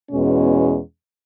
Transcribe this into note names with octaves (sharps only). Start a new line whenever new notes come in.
E2 B2 G#3 C#4